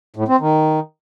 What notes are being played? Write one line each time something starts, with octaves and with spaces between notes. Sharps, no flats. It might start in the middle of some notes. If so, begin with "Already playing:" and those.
A2
C4
D#3